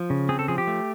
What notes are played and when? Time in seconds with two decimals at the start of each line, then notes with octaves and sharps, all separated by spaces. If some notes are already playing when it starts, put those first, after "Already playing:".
Already playing: F3
0.10 C#3
0.29 C4 G#4
0.39 A4
0.48 F3 G#4
0.58 G4
0.67 A3